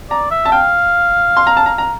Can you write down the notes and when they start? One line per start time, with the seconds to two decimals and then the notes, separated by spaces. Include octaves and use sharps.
0.10 D5 A#5
0.31 E5
0.45 A5
0.52 F5 G5
1.37 C6
1.47 A#5
1.57 A5
1.66 A#5
1.78 A#5